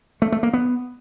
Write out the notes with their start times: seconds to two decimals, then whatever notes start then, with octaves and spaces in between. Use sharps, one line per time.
0.22 A3
0.32 A3
0.43 A#3
0.53 B3